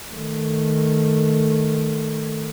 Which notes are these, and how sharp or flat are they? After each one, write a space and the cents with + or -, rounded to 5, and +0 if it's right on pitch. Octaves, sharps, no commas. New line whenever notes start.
D#3 +0 A3 +0